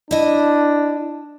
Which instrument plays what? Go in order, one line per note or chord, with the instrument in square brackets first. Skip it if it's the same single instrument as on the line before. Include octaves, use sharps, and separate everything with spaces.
[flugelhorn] D4 [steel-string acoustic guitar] E4 D#5